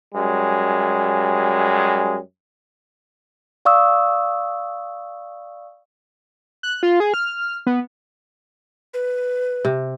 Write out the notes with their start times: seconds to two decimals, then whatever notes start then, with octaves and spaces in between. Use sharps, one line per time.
0.13 F#2 G3 G#3
3.65 D5 F5 C#6 D#6 E6
6.63 F#6
6.83 F4
7.00 G#4
7.14 F6
7.67 B3
8.94 B4
9.65 C3